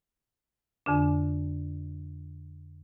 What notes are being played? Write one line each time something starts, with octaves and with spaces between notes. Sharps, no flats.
F2 D3 D4